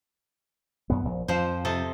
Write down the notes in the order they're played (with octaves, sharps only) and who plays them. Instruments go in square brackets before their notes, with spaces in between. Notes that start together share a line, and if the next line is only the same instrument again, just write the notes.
[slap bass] F#2 B3
A#1
[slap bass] F2 [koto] F3 C5
[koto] C3 A4 D#5